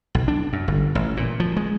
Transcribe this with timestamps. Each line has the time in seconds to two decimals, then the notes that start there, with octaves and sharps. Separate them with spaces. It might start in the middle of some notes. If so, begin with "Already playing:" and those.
0.15 B1
0.28 D4
0.53 F#2
0.68 G1
0.95 A1
1.17 A#2
1.40 F3
1.57 G#3